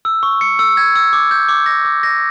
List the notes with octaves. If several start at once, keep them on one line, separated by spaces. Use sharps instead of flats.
E6
C#6
C#7
E6
G#6
E6
D6
G6
D6
A#6
D6
A#6